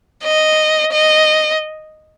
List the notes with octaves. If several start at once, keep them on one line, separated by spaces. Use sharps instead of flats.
D#5
D#5